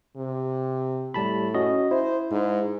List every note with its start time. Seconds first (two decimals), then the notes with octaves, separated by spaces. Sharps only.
0.16 C3
1.14 A2 G3 A5 B5
1.54 C#4 F#4 D#5
1.91 E4 C5
2.31 G#2